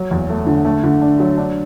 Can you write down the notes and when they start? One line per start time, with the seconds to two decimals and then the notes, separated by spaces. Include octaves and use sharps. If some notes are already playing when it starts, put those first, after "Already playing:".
Already playing: F#3
0.11 E2
0.29 A3
0.46 D3
0.65 A3
0.84 D3
1.01 D4
1.20 F#3
1.37 D4